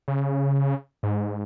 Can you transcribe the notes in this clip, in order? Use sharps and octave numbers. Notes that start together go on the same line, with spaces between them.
C#3
G#2